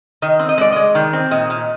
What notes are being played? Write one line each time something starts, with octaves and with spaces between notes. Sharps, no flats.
D#3 D#5
C4
D#5
G#3 D5
G#3 D#5
D#3
C4
A#2 D#5
A#2